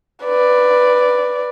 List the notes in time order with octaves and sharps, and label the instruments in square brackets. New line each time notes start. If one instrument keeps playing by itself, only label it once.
[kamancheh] B4 D5